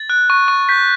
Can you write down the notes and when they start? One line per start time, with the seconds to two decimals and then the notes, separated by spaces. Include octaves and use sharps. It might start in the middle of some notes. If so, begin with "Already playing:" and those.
Already playing: A6
0.10 F#6
0.30 C#6
0.48 C#6
0.69 G6 B6